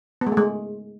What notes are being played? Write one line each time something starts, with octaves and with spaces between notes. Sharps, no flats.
B3
G#3
A3
G#3